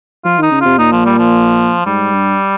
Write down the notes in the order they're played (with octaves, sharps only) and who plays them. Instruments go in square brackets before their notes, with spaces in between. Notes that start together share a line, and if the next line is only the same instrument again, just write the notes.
[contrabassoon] F3 [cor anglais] F4
[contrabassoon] D#3 [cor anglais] D#4
[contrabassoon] C#3
[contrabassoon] C3 [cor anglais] F4
[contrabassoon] A#2 [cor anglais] D#4
[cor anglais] F3
G3
F3
[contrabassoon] G#2 [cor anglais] G3
[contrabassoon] G2